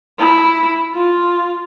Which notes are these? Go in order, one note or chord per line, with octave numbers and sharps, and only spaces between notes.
E4
F4